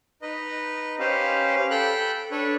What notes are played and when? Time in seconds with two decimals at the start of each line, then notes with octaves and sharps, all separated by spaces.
0.22 D#4 B4 D#5
0.99 C#4 G4 B4 C5 F5
1.55 F5
1.71 A4 G5 B5 F#6
2.31 D4 A4 B4 C#5